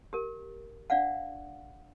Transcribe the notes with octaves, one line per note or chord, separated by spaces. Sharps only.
G4 A#4
D4 D5 F5 F#5